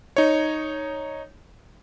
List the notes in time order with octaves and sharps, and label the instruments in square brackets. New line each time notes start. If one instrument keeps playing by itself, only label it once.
[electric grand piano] D#4 C#5